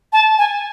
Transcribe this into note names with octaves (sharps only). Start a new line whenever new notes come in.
A5
G#5